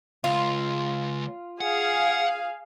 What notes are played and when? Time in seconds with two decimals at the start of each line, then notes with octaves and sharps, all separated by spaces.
0.24 C#2 F4
1.61 G#4 F5 F#5